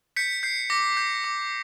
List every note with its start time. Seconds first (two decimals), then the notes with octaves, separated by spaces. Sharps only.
0.16 G6 B6 C#7
0.43 G6 C7
0.70 D6 A#6
0.97 G6
1.24 D6